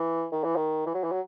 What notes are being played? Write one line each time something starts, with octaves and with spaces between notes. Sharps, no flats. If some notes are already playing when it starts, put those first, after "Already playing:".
Already playing: E3
D#3
E3
D#3
E3
F#3
E3
F#3